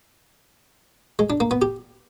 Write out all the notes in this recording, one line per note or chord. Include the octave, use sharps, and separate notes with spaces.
G#3
D4
A#3
B3
G4